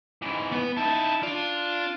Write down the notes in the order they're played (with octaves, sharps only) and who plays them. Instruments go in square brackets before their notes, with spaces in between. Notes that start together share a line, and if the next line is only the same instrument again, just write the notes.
[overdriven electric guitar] G#2 E3
[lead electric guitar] B3 B4
[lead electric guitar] D#4 E4 [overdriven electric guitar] A5
[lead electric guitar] D4 D5 [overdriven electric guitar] F4